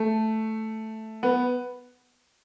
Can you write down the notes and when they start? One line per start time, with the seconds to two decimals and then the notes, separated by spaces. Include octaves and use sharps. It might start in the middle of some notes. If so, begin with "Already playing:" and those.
Already playing: A3
1.23 B3